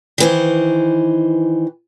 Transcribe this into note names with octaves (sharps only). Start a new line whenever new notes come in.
D#3 E3 C5